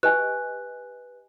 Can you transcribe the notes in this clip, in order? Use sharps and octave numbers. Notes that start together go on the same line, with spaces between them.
G4 B4 D#5 G#5 F#6